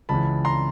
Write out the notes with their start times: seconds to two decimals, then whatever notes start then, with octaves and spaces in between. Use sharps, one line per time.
0.09 C#2 C#3 E3 A5 B5
0.45 A#5 C6